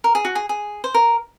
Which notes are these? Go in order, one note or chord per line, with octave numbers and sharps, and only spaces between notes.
A#4
G#4
F#4
G#4
G#4
C5
A#4